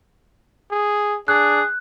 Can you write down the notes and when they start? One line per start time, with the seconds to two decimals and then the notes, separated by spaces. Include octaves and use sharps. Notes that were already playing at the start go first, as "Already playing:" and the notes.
0.71 G#4
1.28 D4 G#4 F#6